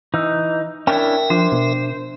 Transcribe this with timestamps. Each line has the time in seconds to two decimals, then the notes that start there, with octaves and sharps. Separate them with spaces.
0.14 E3 D#4
0.87 C#4 D4 E4 A#4 E5 G5
1.30 F3 D4 C5
1.52 B2